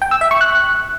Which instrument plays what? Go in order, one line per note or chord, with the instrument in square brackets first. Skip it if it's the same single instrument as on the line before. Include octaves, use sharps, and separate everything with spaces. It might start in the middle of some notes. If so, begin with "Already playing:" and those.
[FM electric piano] G5
E6
E5
C#6
F#6